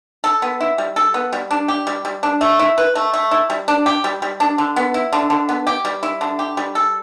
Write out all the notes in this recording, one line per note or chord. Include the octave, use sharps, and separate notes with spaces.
A4
B3
E4
G3
A4
B3
G3
D4
G4
G3
G3
D4
A3
E4
B4
A3
A3
E4
G3
D4
G4
G3
G3
D4
D3
B3
E4
D3
D3
B3
G4
G3
E4
D3
G4
G3
A4